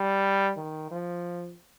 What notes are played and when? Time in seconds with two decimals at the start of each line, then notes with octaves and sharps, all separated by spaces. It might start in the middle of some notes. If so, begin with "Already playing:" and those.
Already playing: G3
0.57 D#3
0.91 F3